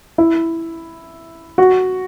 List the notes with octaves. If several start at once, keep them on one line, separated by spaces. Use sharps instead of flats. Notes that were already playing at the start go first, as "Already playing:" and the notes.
E4
F#4